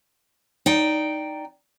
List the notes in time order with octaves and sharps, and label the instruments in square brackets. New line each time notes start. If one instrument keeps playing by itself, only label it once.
[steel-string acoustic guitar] D#4 D5 G5